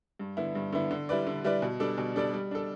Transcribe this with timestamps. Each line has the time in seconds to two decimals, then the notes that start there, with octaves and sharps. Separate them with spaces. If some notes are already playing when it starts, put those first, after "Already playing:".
0.19 G2
0.37 D3 B3 E4
0.55 G2
0.72 D3 B3 E4
0.91 D3
1.09 G3 E4 B4 D5
1.26 D3
1.44 G3 E4 B4 D5
1.62 B2
1.80 G3 D4 A4 D5
1.98 B2
2.16 G3 D4 A4 D5
2.34 G3
2.51 D4 A4